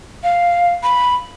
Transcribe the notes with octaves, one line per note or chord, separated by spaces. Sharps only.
F5
B5